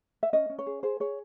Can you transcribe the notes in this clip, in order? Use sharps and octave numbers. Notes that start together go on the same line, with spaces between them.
E5
C#4 D#5
C#4
C#5
G#4
G#4 C5
G#4 C#5